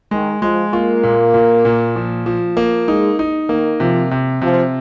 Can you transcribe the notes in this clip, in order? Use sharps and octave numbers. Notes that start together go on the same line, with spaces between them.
D#3 G#3
F3 G#3
A#3 F4
A#2
A#2
A#2
F3
F3
A#3
G#3 D#4
D#4
D#3 A#3
C3 F3
C3
C3 F3